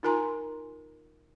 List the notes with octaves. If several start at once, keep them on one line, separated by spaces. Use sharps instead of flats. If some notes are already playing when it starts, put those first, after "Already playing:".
D#4 F4 A#4 G#5 A#5 C6